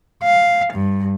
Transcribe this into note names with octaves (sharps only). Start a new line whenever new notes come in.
F5
G2